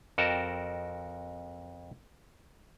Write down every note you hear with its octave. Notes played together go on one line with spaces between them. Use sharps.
F2 F#4 A#4 G5 A5